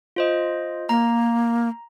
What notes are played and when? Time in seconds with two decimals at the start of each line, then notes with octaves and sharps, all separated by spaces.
0.16 F4 C5 D#5
0.89 A#3 A#5